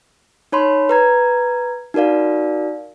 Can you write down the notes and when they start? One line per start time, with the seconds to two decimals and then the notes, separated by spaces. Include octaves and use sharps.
0.52 D#4 C#5 B5 C6
0.89 B4 A#5 G#6
1.94 D#4 F#4 A#4 D5 F5